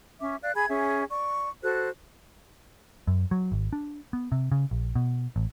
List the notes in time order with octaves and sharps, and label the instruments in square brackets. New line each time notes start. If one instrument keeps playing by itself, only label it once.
[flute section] C#4 E5 D6
D5 F5 F#6
G#4 G#5 B5 G#6
C#4 G#4 E5
D5 C#6
F#4 A4 C5 F#6
[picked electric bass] F#2
F#3
G#1
D4
B3
C3
C#3
A#1
B2
A1